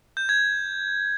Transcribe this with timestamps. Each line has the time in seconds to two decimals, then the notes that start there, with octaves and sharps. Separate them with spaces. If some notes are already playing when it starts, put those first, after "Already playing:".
0.17 G6
0.29 G#6